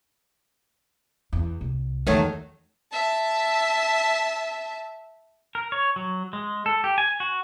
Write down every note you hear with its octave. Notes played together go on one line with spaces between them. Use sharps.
E2
C2
E2 D#3 F#3 A3
E5 A5
A#4
C#5
F#3
G#3
A4
G4
G#5
F#4